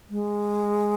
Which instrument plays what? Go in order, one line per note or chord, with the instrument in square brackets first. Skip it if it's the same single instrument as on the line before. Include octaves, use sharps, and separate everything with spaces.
[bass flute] G#3